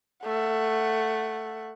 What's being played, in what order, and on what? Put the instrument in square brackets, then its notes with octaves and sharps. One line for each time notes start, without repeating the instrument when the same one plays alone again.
[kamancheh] A3 F#5